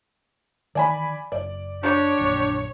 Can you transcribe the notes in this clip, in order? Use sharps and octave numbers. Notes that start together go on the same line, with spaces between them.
D#3 E3 D5 G#5 B5
F#1 D5
D4 G4 C#5
A#1 F#2 A#2